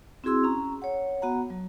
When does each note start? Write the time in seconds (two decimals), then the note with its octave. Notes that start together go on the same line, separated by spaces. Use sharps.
0.24 C4 E4 F#4 G#4 C6 E6
0.44 C#4 A#5
0.82 C#5 F#5
1.22 B3 F#4 F#5 A#5
1.50 F#3